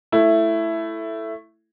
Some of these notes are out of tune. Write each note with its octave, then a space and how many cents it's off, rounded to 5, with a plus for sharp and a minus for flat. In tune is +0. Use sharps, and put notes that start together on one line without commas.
A3 +0 E4 +10